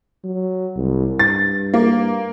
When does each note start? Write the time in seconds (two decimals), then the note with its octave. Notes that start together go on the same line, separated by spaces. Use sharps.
0.24 F#3
0.76 C2
1.19 G2 A6
1.74 A#3